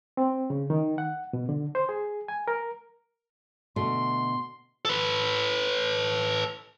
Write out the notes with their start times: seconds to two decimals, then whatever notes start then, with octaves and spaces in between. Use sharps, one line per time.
0.17 C4
0.50 C#3
0.70 D#3
0.98 F#5
1.33 B2
1.49 D3
1.75 C5
1.89 G#4
2.28 G#5
2.48 A#4
3.76 B2 D3 A3 C6
4.85 A4 B4